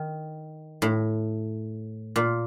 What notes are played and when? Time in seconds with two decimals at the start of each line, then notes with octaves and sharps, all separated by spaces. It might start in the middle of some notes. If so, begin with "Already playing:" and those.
Already playing: D#3
0.82 A2
2.16 A#2